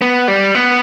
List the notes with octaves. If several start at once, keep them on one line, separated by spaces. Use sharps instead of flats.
B3
G3
B3